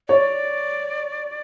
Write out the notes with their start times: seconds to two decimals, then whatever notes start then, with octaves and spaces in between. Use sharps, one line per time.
0.08 C#5 D5